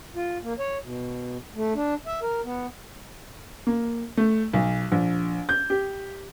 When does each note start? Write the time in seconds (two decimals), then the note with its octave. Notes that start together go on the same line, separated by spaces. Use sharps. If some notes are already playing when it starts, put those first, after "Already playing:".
0.16 F4
0.43 A#3
0.59 C#5
0.83 B2
1.55 A3
1.75 D4
2.07 E5
2.22 A#4
2.44 B3
3.67 A#3
4.17 A3
4.53 B1
4.92 A#1
5.49 G6
5.70 G4